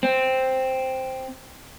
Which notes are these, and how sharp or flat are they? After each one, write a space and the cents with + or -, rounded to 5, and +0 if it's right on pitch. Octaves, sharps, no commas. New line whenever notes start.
C4 +0